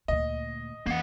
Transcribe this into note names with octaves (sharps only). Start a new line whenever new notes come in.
D2 A#2 D#5
F2 E3 A#3 F#5